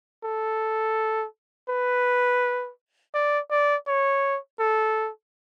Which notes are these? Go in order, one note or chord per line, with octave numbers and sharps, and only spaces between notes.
A4
B4
D5
D5
C#5
A4